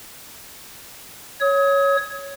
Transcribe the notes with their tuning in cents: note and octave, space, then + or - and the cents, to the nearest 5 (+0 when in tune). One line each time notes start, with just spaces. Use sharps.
C#5 +0 D#6 +35